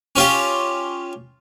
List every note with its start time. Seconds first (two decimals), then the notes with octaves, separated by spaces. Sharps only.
0.16 C#4 F4 G4